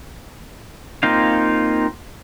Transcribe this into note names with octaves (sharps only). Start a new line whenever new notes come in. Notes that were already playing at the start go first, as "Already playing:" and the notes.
A#3 C4 D#4 F4 F5